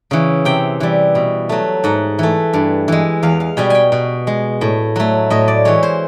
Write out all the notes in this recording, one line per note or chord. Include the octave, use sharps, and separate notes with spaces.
C#3 E3
C3 G5
E3 G3
B2
F#3 A3
G#2 F#5
E3 A3
G2
E3 G#3
E2 F5
F5
B2 G3 G#5
G5 G#5
B2
G#3
A2
F#3 A3
A2 D#5
D5
E3 G#3 C#5
C5